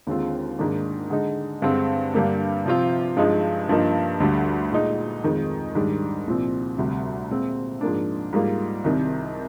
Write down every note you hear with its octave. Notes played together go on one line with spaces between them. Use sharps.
D#2 D3 G#3 C4 F4
G#2 D#3 A#3 D4
D3 G#3 D#4
G2 D3 G#3 C4
G2 D3 G3 A#3 D4
C3 F3 C4 F4
G2 F3 G#3 D#4
G2 F3 A#3 D#4
D2 D3 G3
A#2 G#3 D#4
F2 D#3 G#3
G#2 D#3 G3 D4
C2 A#2 F3 C4
D2 C3 G3
A#2 G#3 C4 F4
G#2 F3 A#3 D4
G#2 G3 A#3 F4
C2 C3 D#3